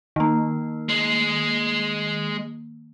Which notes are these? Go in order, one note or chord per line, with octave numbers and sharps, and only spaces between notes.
D#3 A#3
G#3